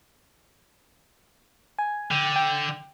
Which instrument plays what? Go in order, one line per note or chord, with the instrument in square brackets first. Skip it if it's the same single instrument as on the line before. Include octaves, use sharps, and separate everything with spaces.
[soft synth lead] G#5
[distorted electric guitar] D3 [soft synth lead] G5
[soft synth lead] G5